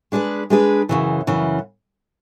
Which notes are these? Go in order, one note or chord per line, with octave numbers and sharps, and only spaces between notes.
G#3 D4 G#4 B4
G#3 D4 G#4 B4
F#2 C#3 E3
F#2 C#3 E3